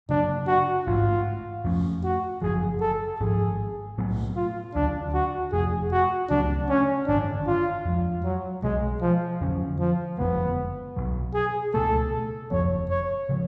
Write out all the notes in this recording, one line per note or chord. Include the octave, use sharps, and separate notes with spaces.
F#2 C#3 F#3 D4
F#4
A1 G#2 G#3 F4
F2 F3 A3 C#4
F#4
F#1 F#2 F3 G#4
A4
G#1 G#2 F3 G#3 G#4
B1 A2 F#3 B3
F4
D2 C#3 F#3 D4
F#4
F1 F2 F3 A3 G#4
F#4
C#2 C#3 F#3 A3 D4
C#4
G#1 F#2 D3 D4
F4
F2 F3 G#3
F#3
B1 B2 F#3 G#3
F3
F2 D3 F#3 C#4
F3
F#1 F2 D3 G#3 B3
B1 B2 F#3
G#4
C#2 B2 A3 A4
F#1 F2 F3 B3 C#5
C#5
C#3 F3 G#3